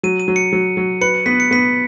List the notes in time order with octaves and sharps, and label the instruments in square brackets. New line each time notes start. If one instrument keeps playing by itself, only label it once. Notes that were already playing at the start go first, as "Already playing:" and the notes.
[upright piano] F#3 [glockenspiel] D#7
[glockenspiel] D#7
[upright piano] F#3
[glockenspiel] C#7
[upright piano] F#3
F#3
[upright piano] B4 [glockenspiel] C#7
[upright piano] B3 [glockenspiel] B6
[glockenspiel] C#7
[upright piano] B3 [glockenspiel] B6